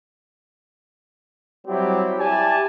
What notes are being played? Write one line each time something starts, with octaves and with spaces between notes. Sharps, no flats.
F#3 G3 C4 E4 G4
E4 G4 D5 G#5 A5